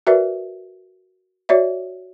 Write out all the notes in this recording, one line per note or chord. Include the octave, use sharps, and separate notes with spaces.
F#4 A#4 B4 D5 E5
F#4 C#5 D5 E5